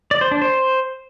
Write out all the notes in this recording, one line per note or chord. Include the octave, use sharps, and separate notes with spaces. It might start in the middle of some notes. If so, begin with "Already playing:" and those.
D5
C5
D4
C5